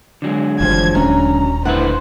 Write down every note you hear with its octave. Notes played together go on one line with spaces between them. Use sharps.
D3 F#3 G#3
F#1 E3 F3 G3 C5 G#6
D#1 C#4 D4 A#5
A2 D3 G3 E4 B4 C5 F#5